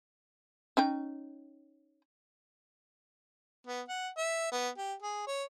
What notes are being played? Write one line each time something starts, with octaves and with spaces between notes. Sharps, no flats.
C#4 D#4 G5
B3
F#5
E5
B3
G4
G#4
C#5